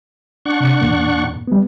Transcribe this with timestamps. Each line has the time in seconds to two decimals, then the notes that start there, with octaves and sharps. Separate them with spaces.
0.45 D4 F#5 C#6
0.60 C3
0.81 E2 A#2 A#3
1.47 G3 B3